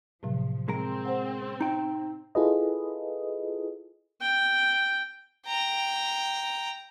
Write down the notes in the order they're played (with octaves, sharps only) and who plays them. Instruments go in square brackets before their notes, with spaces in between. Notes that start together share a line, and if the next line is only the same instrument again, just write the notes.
[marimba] A2 C3 F#3 [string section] F3
[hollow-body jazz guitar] G#3 A#4 [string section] C4
[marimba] C5 F#5
[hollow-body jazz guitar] D#4 G5
[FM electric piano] E4 F4 G#4 A4 B4 D#5
[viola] G5
[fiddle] G5 A#5